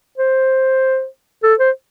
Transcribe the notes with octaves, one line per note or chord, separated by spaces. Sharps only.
C5
A4
C5